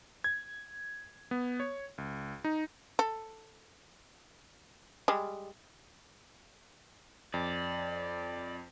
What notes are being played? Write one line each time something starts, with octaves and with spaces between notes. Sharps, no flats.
G#6
B3
C#5
C#2
D#4
A4
G3 G#3
F2 D5